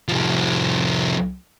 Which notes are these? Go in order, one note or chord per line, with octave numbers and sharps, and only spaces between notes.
C2 F3